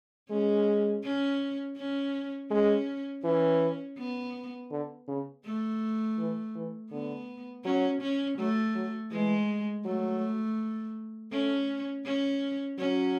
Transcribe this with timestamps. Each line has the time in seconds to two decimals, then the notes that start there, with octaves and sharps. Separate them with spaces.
0.30 G#3 C#4
1.03 C#4
1.77 C#4
2.50 G#3 C#4
3.24 E3 C#4
3.98 B3
4.71 D3
5.08 C#3
5.45 A3
6.18 E3
6.55 E3
6.91 D3 B3
7.64 F#3 C#4
8.01 C#4
8.37 F#3 A3
8.75 F#3
9.11 E3 G#3
9.84 F#3 A3
11.32 A3 C#4
12.05 C#4
12.79 F#3 C#4